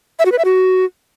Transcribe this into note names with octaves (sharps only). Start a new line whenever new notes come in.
E5
F#4
B4
E5
F#4